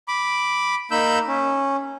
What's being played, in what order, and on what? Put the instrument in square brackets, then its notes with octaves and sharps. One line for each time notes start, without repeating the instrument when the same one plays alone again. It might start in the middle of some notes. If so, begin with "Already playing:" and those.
[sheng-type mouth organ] B5 D6
A#3 D#4 B5 E6 G6
C#4